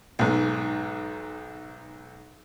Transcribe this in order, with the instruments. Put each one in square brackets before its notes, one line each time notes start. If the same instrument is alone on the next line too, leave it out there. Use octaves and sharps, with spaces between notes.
[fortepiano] B1 G#2